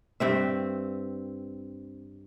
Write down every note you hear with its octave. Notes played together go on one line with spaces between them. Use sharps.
G2 C4 E5